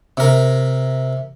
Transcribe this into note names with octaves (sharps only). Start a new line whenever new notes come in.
C3 A#4